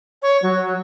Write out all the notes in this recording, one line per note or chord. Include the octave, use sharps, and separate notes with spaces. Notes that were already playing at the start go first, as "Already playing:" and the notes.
C#5
F#3